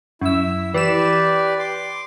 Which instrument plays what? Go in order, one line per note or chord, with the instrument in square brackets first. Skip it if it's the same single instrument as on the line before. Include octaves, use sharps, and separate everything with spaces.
[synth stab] F#2 E6 [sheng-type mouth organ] E4
[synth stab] E3 E7 [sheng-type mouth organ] G4 B4 D5
[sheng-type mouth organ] C6 D6